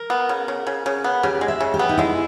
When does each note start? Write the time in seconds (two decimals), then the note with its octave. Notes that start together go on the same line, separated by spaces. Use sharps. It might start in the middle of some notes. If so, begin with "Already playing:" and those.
Already playing: A#4
0.10 B3
0.29 C#3
0.48 C#3
0.67 C#3
0.86 C#3
1.04 B3
1.23 C#3 G4
1.41 G#3
1.48 E5
1.61 C#3
1.74 G4
1.79 B3
1.89 D#4
1.98 G#3 E4